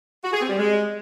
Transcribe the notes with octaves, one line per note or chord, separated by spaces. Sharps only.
F#4
G#4
C4
G3
G#3